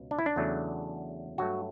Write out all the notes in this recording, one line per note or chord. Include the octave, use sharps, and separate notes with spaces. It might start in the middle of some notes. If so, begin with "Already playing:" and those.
Already playing: C#2 B2
D4
E4
D4
E2 C#3 F#3 A3
G2 F#3 A3 F#4